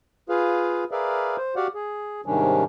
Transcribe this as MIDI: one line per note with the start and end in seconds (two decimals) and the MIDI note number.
0.29 0.84 65
0.29 0.84 68
0.29 0.84 71
0.29 0.84 77
0.91 1.37 68
0.91 1.37 70
0.91 1.37 71
0.91 1.37 74
0.91 1.37 76
0.91 1.37 77
1.37 1.55 72
1.56 1.67 66
1.56 1.67 67
1.56 1.67 74
1.56 1.67 77
1.56 1.67 78
1.74 2.21 68
2.26 2.64 44
2.26 2.64 48
2.26 2.64 51
2.26 2.64 55
2.26 2.64 61
2.26 2.64 62